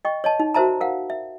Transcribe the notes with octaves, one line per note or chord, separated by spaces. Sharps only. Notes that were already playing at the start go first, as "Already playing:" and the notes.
D#5 G5 C#6
C#5 D#5 A5
D#4
F#4 A#4 C5 E5 A5 A#5
A#4 F5 F#5
E5